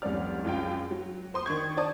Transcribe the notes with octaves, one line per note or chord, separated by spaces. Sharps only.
F1 C2 G#2 C#4 D5 F6
C#2 F#2 F4 G5
F#3
C5 C6 D#6
D#3 D4 C#6 G#6
C5 D5 A5 D#6